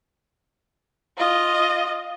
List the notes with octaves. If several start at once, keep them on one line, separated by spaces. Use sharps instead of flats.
F4 D#5